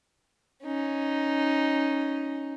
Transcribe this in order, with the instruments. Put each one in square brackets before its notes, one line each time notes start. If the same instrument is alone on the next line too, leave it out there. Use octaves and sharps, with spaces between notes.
[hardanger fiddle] C#4 D#4